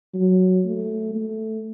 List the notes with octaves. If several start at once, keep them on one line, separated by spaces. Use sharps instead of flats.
F#3
A3
A3